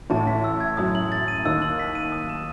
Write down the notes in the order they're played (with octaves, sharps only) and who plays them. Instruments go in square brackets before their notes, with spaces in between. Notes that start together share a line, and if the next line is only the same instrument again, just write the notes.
[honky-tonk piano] A1 A2 [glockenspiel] A5
[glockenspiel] B6
E6
G#6
[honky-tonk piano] F#2 F#3 [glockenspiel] D#6
[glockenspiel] F#7
A6
D#7
[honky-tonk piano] D#2 D#3 [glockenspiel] E6
[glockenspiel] F#7
B6
D#7
D#6
E7